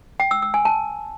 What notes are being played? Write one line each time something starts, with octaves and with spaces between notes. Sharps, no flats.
G5
E6
E6
G#5
A5